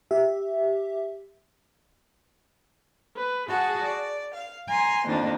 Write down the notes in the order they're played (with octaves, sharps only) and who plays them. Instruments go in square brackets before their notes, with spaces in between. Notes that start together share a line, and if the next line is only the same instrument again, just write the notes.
[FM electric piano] G4 E5
[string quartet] B4
F#4 G#4 F#5 A5
D5
F5
G#5 A#5 C6
F2 D#3 A#3 D4